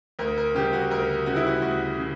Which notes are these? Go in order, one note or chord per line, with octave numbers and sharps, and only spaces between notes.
D2 A#4
A#4
C#3 G3 G4
F#4
D2 A#4
C#3 G3 F#4
E4
F#4
D2 F#4
C#3